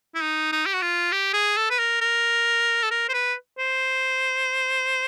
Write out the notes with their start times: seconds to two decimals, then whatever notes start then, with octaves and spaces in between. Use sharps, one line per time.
0.15 E4
0.22 D#4
0.52 D#4
0.66 G4
0.74 F#4
0.82 F4
1.12 G4
1.34 G#4
1.57 A4
1.70 B4
1.79 A#4
2.01 A#4
2.83 A4
2.91 A#4
3.09 C5
3.14 B4
3.59 C5